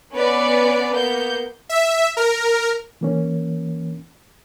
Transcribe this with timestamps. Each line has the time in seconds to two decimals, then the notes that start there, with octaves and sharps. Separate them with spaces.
0.12 B3 C#4 B4 D5
0.90 A#3 B3 G6
1.69 E5
2.17 A#4
3.01 E3 A#3 C#4